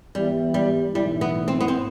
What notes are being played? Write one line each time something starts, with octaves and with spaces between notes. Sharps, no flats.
E3 G3 B3 E4 G4
G3
B1 A2 E3 G3 A3 E4
B3
C4
B3
C4